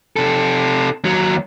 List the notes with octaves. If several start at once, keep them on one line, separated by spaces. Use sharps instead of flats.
C3 A4
D#2 F#3